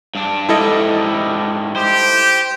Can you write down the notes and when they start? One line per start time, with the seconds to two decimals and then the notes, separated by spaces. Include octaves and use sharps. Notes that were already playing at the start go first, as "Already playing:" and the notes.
0.15 G2 D4
0.49 G#2 G3 E4 A4 D#5
1.76 G4 C5